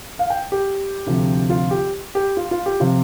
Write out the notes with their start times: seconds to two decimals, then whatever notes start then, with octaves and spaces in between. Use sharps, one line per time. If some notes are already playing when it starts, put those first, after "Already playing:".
0.19 F5
0.30 G5
0.52 G4
1.06 D2 C3 F3
1.50 F4
1.71 G4
2.15 G4
2.37 F4
2.51 F4
2.66 G4
2.80 C3 F3 F4